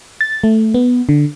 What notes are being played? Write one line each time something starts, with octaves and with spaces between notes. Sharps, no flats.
A6
A3
B3
D3